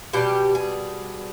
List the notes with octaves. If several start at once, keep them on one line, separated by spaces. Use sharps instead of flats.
B2 G3 G4
G#4